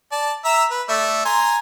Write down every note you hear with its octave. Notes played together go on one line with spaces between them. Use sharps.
D5 A5
E5 A#5 E6
B4
A3 D5 E5
G#5 A#5 C6